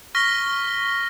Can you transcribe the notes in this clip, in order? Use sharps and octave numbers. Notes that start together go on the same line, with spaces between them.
C#6 F6 A#6 B6 G7